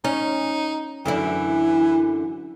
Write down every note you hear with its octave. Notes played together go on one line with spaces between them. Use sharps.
C#4 D#4
F#2 D3 E3 E4